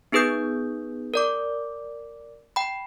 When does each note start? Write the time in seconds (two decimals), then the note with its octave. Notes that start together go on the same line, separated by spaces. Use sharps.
0.12 B3 D#4 G#4 B4 D#6 G6
1.14 A#4 D5 D6
2.56 G5 B5